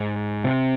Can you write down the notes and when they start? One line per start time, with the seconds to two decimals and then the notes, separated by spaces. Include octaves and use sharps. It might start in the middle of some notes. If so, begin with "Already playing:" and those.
Already playing: G#2
0.44 C3 C4